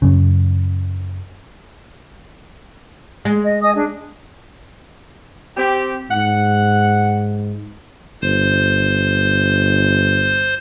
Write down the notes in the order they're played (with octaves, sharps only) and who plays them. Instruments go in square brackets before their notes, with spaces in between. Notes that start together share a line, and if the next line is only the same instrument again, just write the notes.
[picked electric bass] F#2 C#3
[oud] G#3
[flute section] D#5
D#5 G#5 D#6
D4 G#4
[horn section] C4 G4
[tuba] G#2 [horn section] F#5
[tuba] G1 [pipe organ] C5